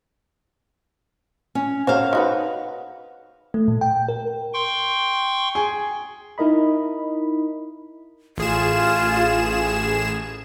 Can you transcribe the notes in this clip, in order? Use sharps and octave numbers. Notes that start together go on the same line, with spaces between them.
C#4
F#4 A#4 C5 C#5 F5
D#4 F#4 B4
A3
A#2
G5
A#4
G5 C6 C#6
G#4
D#4 E4 A#4 D#5 B5
A1 F4 G#4 E7